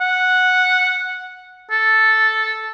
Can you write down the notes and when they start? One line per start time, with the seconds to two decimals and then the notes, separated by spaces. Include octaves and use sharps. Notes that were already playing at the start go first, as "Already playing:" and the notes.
0.01 F#5
1.71 A4